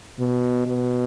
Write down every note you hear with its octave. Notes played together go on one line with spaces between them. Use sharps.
B2
B2